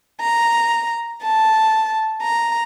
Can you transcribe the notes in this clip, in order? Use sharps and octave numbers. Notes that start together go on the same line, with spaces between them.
A#5
A5
A#5